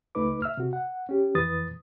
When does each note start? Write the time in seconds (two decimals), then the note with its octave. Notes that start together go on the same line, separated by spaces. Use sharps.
0.15 C#2 A3 D#4 B4 D6
0.42 E5 E6 F6
0.57 C3 F#4
0.73 F#5
1.09 C#4 G4
1.35 F2 E3 B4 D#6 A6